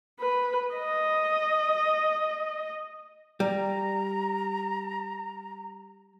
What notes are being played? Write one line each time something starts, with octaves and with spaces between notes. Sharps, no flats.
B4
D#5
G3 A#5